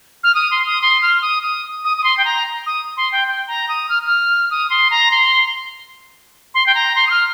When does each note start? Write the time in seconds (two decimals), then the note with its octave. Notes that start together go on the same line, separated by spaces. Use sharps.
0.24 F6
0.35 D#6
0.51 C6
0.66 D#6
0.82 C6
1.02 F6
1.22 D#6
1.43 D#6
1.84 D#6
1.97 D#6
2.04 C6
2.17 G5
2.25 A#5
2.66 D#6
2.97 C6
3.12 G5
3.28 G5
3.48 A#5
3.69 D#6
3.89 F6
4.07 F6
4.51 D#6
4.70 C6
4.91 A#5
5.11 C6
6.54 C6
6.66 G5
6.75 A#5
6.96 C6
7.07 D#6
7.11 F6